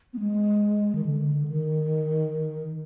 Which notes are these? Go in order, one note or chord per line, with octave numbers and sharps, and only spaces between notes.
B3
G#3
D#3
D3
D#3